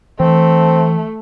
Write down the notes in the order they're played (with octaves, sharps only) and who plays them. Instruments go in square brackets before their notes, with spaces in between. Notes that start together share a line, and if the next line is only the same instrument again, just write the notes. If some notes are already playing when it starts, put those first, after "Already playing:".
[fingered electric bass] E3 [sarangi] A3 [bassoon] C4